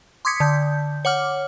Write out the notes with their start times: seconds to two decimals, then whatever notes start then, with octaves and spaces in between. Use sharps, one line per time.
0.25 C6 D6 D#6 G#6 B6 C#7
0.40 D3 G6
1.05 C#5 F#5 D6 F6